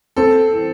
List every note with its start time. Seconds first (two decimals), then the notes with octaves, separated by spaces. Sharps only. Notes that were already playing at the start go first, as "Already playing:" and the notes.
0.17 C4 A4
0.53 E3